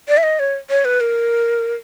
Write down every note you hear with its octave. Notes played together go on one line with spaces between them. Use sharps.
D5
E5
D#5
C#5
C#5
B4
A#4